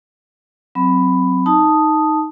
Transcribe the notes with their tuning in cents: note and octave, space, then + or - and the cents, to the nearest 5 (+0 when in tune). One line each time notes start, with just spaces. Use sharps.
F#3 +0 C4 +0 B5 +10
D#4 +0 A5 +0 D#6 +0